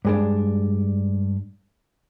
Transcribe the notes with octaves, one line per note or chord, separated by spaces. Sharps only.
G2 G#3 D4